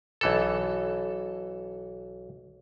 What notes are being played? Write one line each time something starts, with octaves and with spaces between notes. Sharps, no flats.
B1 E3 A4